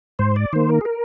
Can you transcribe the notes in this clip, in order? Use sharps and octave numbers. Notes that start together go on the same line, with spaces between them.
G#2 C5
D5
D#3 A#3 C5
A#4
G#4
A#4